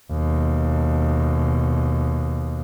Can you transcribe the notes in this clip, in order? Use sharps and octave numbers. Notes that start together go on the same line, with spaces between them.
D#2 B2